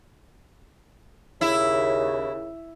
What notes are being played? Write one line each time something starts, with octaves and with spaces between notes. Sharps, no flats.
D#2 C#3 E4